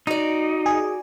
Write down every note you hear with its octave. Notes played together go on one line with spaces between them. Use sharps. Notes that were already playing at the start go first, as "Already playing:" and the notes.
D#4 F#4 D5
G#4